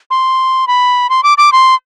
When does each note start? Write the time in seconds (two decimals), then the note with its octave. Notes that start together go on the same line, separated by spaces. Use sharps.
0.11 C6
0.67 B5
1.10 C6
1.23 D6
1.38 D6
1.52 C6